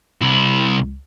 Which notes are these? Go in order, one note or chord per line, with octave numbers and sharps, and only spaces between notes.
C2 E4